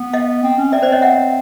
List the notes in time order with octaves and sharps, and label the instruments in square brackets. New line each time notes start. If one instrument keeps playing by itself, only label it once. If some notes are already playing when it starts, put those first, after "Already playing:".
Already playing: [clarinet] B3
[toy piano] D#5 F5
[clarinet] C4
C#4
[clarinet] C4 [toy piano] D5 E5
[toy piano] C5 D5
C#5 D#5
E5 F#5